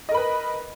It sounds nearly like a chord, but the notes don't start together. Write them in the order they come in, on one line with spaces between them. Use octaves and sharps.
D#5 A#4 B5 B4